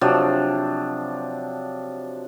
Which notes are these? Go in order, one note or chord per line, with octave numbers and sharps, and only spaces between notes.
C3 F3 F#3 D4